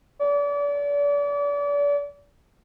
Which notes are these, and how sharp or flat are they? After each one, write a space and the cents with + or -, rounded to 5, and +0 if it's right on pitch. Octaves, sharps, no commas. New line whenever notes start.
D5 -35